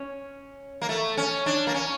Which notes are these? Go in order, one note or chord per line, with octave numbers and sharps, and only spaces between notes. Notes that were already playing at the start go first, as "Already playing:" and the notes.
Already playing: C#4
A#3
A3
C#4
D4
A#3
C#4